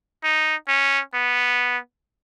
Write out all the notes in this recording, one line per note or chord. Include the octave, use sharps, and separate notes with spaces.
D#4
C#4
B3